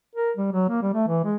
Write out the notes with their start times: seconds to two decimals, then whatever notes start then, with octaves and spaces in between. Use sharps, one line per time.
0.15 A#4
0.37 G3
0.52 F#3
0.69 A#3
0.82 G3
0.93 A3
1.08 E3
1.24 G#3